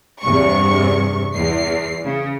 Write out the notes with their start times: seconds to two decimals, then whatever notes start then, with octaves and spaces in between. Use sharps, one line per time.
0.23 E2 G2 C3 C#6
1.34 E2 C7
2.04 C#3